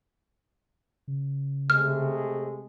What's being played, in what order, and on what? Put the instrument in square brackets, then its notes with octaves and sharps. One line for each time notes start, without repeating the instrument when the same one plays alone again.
[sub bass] C#3
[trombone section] C3 G#3 A3 [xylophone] F6